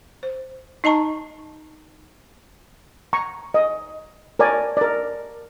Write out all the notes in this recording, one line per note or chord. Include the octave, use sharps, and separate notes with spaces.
C5
D#4 D#5 A5 A#5 C#6
A#5 C#6
D#5
A#4 C#5 D5 G#5
A#4 D5